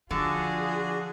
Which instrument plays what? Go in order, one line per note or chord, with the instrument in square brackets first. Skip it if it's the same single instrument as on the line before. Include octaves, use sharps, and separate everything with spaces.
[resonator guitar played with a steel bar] D3 [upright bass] F3 [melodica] D4 F#4 [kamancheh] F4 G#4